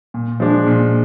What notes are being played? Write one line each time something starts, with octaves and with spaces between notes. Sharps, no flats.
A#2
F3 G#3 D4
A#2